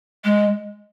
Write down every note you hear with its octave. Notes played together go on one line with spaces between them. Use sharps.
G#3